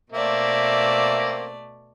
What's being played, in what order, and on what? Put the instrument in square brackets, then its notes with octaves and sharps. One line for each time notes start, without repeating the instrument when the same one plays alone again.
[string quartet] B2 A3 D5 [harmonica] A#3 C4 E5